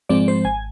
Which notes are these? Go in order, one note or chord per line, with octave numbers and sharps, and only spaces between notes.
G#2 F3 G#3 C4 D5
C5
G#1 G#5